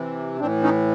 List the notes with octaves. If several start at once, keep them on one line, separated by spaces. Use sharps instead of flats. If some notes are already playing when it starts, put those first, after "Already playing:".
Already playing: C3 E3
A2 E3 C4 D4
C#4 D#4